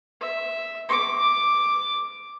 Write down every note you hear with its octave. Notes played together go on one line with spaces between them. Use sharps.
E5
D6